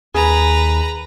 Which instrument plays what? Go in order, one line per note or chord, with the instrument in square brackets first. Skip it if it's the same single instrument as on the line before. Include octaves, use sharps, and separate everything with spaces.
[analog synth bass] D#2 [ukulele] G#4 [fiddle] B4 A#5